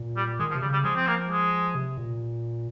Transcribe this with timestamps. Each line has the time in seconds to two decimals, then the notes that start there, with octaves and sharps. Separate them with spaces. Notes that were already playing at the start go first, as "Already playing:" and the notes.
Already playing: A#2
0.16 G3
0.39 D#3 G#3
0.51 F3
0.55 C3
0.61 C#3 G3
0.73 G3
0.84 F3 G#3
0.96 C4
1.07 A#3
1.29 G#3
1.75 C3
1.97 A#2